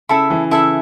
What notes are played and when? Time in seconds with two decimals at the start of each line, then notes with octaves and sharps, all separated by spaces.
0.09 C#3 E4 A4 E5 B5
0.30 E3
0.50 C#3 E4 A4 E5 B5